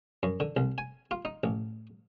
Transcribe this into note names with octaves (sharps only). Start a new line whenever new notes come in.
F#2
D3
C2
G#5
F4
D#4
A1